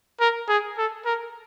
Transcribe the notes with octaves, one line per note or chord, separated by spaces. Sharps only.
A#4
G#4
A4
A#4